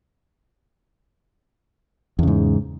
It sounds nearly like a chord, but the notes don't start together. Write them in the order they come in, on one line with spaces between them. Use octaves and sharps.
E2 C#3 G#2